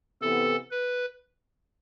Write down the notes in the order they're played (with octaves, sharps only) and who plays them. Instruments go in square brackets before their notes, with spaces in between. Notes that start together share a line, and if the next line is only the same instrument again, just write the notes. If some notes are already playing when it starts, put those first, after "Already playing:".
[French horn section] C3 E3 B3 [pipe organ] A4
[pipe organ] B4